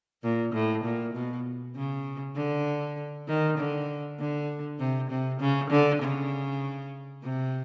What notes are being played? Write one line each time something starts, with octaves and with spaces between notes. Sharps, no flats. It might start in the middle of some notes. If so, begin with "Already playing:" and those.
A#2
A2
A#2
B2
C#3
D3
D#3
D3
D3
C3
C3
C#3
D3
C#3
C3